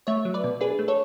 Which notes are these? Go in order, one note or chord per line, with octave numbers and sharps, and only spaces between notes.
A3 C#5 E5
F#3
B4 D5
B2
D4 G#4 B4
A3
A4 C#5